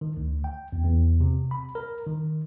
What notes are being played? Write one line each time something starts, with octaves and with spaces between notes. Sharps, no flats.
D#3
D2
G5
E2
E2
C3
B5
A#4
D#3